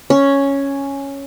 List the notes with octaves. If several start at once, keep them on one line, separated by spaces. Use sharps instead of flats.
C#4